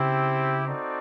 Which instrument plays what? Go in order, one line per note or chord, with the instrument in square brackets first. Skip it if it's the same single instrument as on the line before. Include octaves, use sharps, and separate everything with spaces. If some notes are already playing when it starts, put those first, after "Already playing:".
Already playing: [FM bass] C#3 [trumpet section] C4 E4 G4
[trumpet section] C4 D#4 F#4 A4 D5